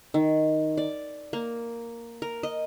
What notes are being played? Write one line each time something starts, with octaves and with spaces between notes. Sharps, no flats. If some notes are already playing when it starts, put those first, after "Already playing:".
D#3
D5
A#3
A#4
D#5